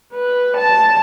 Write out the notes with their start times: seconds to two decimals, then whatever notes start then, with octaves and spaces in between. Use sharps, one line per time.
0.14 B4
0.57 A5